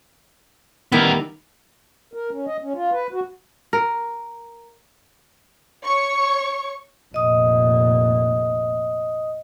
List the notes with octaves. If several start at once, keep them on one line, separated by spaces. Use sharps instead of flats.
D#3 G3 B3 E4 A#4
A#4
C#4
D#5
C#4
F4
B4
F#4
A#4
C#5 C#6
F1 A#2 D#5 D#6